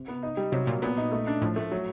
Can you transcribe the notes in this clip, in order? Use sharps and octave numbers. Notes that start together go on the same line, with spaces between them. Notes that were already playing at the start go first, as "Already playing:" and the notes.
Already playing: C3
B3
D#4
G3
C3 F#3
A#2 A#3
A#2 B3
D#4
A3
D4
A2 F3
A3
F#3